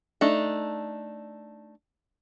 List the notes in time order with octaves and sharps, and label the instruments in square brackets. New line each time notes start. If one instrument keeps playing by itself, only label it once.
[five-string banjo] A3 D4 D#4